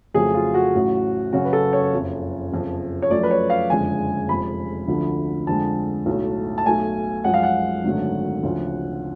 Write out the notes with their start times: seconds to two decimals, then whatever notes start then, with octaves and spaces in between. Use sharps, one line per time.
0.14 F2 C#3 F#3 A3 G#4
0.34 F4
0.54 F#4
0.74 A1 A2 F#3
1.33 F#1 F#2 C#3 F#4
1.45 B4
1.53 A4
1.73 C#5
1.93 F#1 F2 F3
2.52 F#1 F2 F3
3.02 C#5
3.10 F#2 F3 A3 D5
3.23 B4
3.31 C#5
3.50 F5
3.70 F#1 F2 D3 G#3 G#5
4.29 F1 F2 F3 G#3 B5
4.88 D2 D3 F3 A3
5.47 F2 D3 G#3 A5
6.06 B1 A2 F#3 A3
6.58 A5
6.66 B1 B2 A3 G#5
7.24 F#2 F3 G#3 F#5
7.34 F5
7.43 F#5
7.84 G#1 F#2 D3 F#3 A3
8.43 D2 C#3 F3